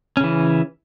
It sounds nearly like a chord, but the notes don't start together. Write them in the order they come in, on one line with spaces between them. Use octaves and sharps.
C#4 C#3 E3